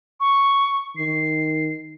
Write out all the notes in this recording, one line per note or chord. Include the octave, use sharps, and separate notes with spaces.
C#6
D#3 C7